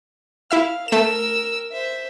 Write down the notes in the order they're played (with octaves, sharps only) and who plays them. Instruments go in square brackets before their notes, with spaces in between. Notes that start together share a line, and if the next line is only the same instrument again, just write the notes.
[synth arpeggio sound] E4 E5 E6 [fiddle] F5
[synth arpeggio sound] A3 E7 [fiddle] A#4 E6
[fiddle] C5 E5